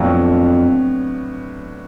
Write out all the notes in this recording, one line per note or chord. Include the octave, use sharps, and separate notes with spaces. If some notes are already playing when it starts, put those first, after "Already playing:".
Already playing: F2 A2 F#3 B3 D4